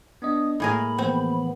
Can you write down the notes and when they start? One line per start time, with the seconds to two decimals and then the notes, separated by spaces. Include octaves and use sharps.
0.22 B3 D4 D#5 D#6
0.60 A2 G#3 A#3 G#4 A#4 B5
0.98 E3 F3 B3 C4